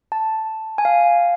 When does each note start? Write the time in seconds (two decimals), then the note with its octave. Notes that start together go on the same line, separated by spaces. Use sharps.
0.12 A5
0.78 G#5
0.85 F5